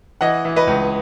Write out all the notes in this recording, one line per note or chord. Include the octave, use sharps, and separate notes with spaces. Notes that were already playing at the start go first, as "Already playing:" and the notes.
E3 D#5 F#5
E3
B4 D#5
C#2